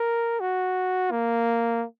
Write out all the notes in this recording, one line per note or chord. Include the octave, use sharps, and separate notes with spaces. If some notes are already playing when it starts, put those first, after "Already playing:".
Already playing: A#4
F#4
A#3